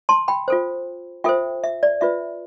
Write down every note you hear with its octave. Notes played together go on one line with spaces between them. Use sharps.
A5 C6
G5 B5
F4 A4 C5
F4 A4 C5 E5 G5
E5
D5
F4 B4 E5